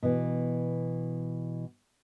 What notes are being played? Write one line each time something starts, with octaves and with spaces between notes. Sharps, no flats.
B2 E3